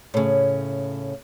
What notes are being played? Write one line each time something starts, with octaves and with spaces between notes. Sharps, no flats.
A2 C#3